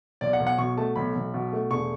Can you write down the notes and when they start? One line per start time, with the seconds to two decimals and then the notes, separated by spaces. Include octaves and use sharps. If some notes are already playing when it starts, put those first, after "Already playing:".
0.21 B1 D5
0.33 F#5
0.40 B1
0.47 F#5
0.58 B2 C#6
0.77 A3 A5
0.96 B1 B5
1.15 B1
1.34 B2
1.53 A3
1.71 E1 C#6